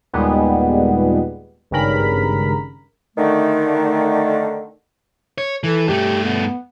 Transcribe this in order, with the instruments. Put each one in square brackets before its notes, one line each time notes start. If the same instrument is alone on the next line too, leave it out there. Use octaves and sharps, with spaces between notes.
[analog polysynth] D#2 A#2 G3 G#3 B3
G#1 G2 C#3 A#4 B5
[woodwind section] D3 D#3 A3
[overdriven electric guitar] C#5
[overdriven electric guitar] E3 [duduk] A4
[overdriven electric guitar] G2 A3 [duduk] G4
[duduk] B3